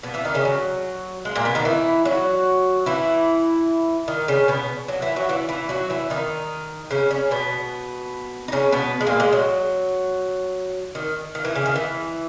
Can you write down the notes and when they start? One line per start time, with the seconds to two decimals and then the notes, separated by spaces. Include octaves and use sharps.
0.03 B2 B3
0.14 E3 E4
0.25 D#3 D#4
0.34 C#3 C#4
0.45 F#3
1.25 G#3
1.35 A#2 A#3
1.45 B2 B3
1.55 D#3 D#4
1.65 E3 E4
2.05 F#3 F#4
2.86 E3 E4
4.08 D#3 D#4
4.28 C#3 C#4
4.48 B2 B3
4.88 F#3 F#4
5.02 E3 E4
5.16 F#3 F#4
5.29 E3 E4
5.49 E3 E4
5.69 F#3 F#4
5.90 E3 E4
6.10 D#3 D#4
6.91 C#3 C#4
7.11 C#3 C#4
7.31 B2 B3
8.48 D#4
8.52 C#3 C#4
8.72 B2 B3
9.01 G#3
9.07 A#2 A#3
9.20 G#3
9.33 F#3
10.95 D#3
11.35 D#3
11.45 E3
11.55 C#3
11.66 D#3
11.76 E3